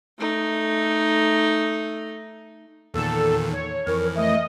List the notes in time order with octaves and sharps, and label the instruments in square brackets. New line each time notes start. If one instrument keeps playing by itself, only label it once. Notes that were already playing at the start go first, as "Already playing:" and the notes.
[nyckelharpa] A3 D#4
[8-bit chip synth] E2 A#2 D#3 [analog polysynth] A4
[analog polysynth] C#5
[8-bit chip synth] F2 E3 [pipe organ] A#4
[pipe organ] A3 [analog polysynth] D#5